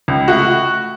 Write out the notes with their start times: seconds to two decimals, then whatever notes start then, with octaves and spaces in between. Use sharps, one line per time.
0.08 C#2
0.28 A3 F#4